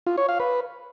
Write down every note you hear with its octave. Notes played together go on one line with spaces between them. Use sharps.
F4
C#5
F5
B4